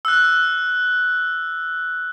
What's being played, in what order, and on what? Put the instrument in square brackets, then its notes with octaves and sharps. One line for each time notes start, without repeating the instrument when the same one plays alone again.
[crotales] E6 F#6